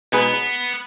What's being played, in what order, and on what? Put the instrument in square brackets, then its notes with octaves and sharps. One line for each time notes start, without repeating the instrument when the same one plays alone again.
[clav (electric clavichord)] B2 G#3 D#4 G#4 B4 [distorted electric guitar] B3